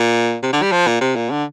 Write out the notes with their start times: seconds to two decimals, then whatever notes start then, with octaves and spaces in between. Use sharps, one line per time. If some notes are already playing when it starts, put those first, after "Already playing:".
Already playing: A#2
0.43 C3
0.53 D3
0.62 G3
0.72 F3
0.87 A#2
1.01 C3
1.16 A#2
1.30 D3